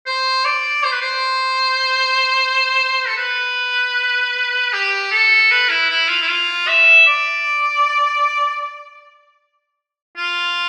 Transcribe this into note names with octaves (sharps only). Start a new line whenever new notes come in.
C5
D5
C5
B4
C5
A4
B4
G4
A4
B4
E4
E4
F4
E4
F4
E5
D5
F4